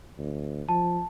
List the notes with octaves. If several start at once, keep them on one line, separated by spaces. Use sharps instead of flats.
D2
F3 A5